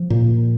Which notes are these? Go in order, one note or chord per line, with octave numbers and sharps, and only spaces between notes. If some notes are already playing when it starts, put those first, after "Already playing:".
Already playing: F3
A#2